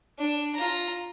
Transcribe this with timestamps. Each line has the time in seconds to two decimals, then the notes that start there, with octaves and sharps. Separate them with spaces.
0.18 D4
0.55 F4 A#5